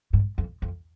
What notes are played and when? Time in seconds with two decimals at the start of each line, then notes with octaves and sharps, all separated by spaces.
0.13 G#2
0.38 F2
0.62 F2